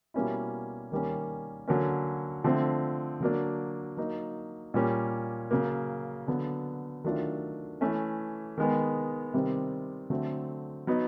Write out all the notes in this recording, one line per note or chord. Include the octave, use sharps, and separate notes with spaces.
B2 G3 A#3 C#4 E4
D#3 G3 A#3 C#4
D3 F#3 A#3 C#4
D3 F3 A3 C4
D3 F#3 A#3 D4
F#3 A#3 D#4
A#2 G3 A#3 C#4
C#3 F#3 A#3
D3 F#3 B3
D#3 F#3 A3 D4 F4
E3 A3 C#4
D#3 G#3 B3
C3 D#3 G3 C4
D3 F#3 A3 C4
F#3 B3 D#4